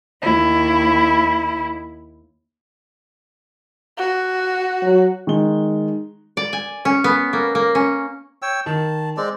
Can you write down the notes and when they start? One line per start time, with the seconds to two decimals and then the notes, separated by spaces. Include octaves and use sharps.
0.21 D#2 E4
3.98 F#4
4.83 F#3
5.27 D#3 G#3 G7
6.37 D5
6.53 G#5
6.85 C#4
7.04 B3
7.33 A#3
7.55 A#3
7.75 C#4
8.42 C#5 G5 E6
8.66 D#3 A5
9.17 G#3 C4 D5